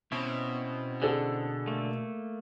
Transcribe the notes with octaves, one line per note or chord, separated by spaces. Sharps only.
B2 C4 C#4 E4
D3 G#4 A4
A3 A#3